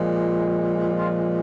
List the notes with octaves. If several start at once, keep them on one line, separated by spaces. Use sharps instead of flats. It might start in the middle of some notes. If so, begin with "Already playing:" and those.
Already playing: A#2 F3 G#3
F4